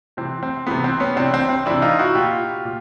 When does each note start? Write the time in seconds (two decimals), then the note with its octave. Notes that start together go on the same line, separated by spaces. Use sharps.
0.17 C3 E3 C4
0.43 C4
0.67 C3 E3 B3
0.84 C4
1.00 B3 C#4
1.16 C3 E3 C4 D4
1.34 C4
1.49 C4
1.66 C3 E3 D4 E4
1.82 D#4 F4
1.99 E4 F#4
2.15 A#2 F4 G4
2.65 A#2